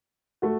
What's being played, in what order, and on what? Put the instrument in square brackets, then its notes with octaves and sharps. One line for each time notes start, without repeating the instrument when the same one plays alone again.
[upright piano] A3 F#4